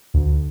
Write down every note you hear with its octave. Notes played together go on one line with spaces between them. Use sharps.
D2